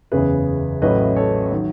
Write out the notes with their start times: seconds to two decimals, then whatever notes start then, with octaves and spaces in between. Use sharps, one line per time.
0.12 F#1 E2 C#3 G#4 B4
0.82 A1 A2 F#3 B4 D#5
1.16 A4 C#5
1.51 D#3 F#3